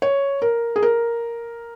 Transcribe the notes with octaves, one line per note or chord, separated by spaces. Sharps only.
C#5
A#4
G#4
A#4